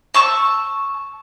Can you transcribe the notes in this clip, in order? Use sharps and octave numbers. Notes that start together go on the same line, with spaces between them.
A5 C#6 E6